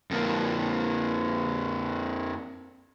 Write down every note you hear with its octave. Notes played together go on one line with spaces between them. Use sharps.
F2 A#3